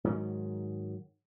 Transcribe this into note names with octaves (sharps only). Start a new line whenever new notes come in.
G#2 D#3 F#3